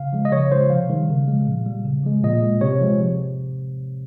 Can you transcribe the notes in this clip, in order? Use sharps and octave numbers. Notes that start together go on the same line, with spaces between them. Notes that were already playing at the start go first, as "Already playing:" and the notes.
Already playing: C#3 F5
F3 G#3
D#5
C#3 C#5
F3 G#3 C5
C3 F5
D#3 G3
C#3
F3 G#3
A#2
G3
C#3
F3 G#3
A#2 D#5
G#3
C3 C#5
F3 G#3
C3